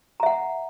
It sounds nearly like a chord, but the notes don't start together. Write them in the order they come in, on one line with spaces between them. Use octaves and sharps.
A#5 E5 F#5